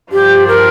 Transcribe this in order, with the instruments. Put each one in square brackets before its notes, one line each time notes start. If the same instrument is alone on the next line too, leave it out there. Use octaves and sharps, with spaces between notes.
[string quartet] G2 F3 D4 F4 [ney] G4
[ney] A#4